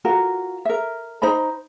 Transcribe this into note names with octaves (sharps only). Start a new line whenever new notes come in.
F4 F#4 A#4
A#4 E5
D#4 C5 A#5 B5